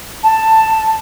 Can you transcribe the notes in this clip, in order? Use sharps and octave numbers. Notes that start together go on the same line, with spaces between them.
A5